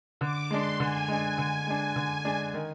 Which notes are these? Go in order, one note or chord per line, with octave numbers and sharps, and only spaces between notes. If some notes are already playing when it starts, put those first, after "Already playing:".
D3 D6
G#3 D4 C6
D3 G#5
G#3 D4
D3
G#3 D4
D3
G#3 D4
D#3